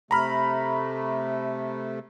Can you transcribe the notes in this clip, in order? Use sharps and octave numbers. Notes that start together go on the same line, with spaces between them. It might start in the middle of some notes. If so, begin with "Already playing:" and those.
C3 A3 A#5 B5 F6